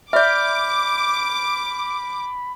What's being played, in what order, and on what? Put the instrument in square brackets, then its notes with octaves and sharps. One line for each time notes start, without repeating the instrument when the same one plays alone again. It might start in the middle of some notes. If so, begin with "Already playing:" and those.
[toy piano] D5 E5 [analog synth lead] B5 [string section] D6 [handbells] F6 G6